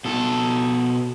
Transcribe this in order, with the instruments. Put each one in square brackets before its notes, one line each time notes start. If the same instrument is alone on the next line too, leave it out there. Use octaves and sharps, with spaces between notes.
[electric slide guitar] B2 A4